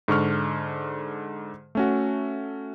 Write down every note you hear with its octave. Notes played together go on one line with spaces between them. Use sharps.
G#2 D3 C#6 F6
A3 C#4 F#4